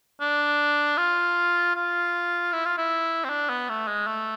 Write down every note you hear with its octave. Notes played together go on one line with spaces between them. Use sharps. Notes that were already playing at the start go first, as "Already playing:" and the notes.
D4
F4
F4
E4
F4
E4
C4
D4
B3
A3
G#3
A3